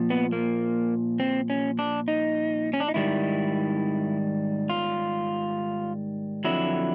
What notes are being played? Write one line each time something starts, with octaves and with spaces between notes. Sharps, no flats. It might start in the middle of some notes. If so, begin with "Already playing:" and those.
Already playing: A#2 F3
B3
A#3
C4
C#4
D4
D#4
C#4
D4
D#4
G#2 D#3 G3 E4
F4
F2 D3 F#3 E4